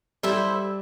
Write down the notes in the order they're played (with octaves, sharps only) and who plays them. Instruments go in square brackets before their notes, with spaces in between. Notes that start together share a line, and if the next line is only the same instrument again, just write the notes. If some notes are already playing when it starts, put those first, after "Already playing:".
[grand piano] G3 [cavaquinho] E4 A4 C5 E5